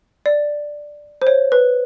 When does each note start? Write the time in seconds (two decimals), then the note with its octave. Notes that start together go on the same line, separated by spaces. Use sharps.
0.26 D5
1.22 C5
1.27 C#5
1.52 B4